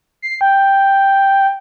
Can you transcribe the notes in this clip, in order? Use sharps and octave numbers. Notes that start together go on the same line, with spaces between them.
C7
G5